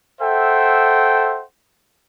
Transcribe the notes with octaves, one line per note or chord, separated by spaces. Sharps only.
A4 C5 E5 F#5 G5